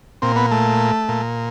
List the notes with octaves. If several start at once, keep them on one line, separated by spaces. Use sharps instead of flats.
A#2 C4
B3
A3
A#2